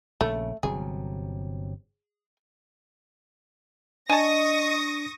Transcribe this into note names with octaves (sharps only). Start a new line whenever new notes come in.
A#1 C#3 A3
G1 C3 F#3 G#4
D4 D#5 G#5 A5 C#6 D#6 A#6